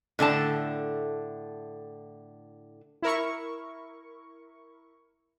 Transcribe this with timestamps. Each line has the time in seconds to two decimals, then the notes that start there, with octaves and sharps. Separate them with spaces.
0.19 A2 D3 A3 A5
3.02 E4 A#4 C#6